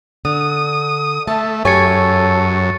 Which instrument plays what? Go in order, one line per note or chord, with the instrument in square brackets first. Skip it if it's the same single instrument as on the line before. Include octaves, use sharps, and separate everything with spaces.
[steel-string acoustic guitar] D3 [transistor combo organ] D#6
[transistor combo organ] A3 [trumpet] E5 [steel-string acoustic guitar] A5
[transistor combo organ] F#2 [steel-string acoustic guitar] G4 C#5 G#5 [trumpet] A4 [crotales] C#6 A6 C#7